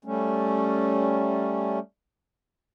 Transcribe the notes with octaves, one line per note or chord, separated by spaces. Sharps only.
G3 A3 C#4